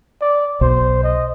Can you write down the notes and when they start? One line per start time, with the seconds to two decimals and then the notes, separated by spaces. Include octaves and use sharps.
0.21 D5
0.61 B1 C5
1.03 D#5